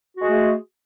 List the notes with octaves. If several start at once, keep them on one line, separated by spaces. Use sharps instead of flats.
G#3 A3 F#4 G#4